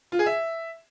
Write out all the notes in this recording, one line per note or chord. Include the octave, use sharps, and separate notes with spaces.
F4
G#4
E5